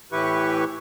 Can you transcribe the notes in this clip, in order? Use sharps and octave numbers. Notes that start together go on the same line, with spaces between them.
A2 E3 E4 G4 B4 C#6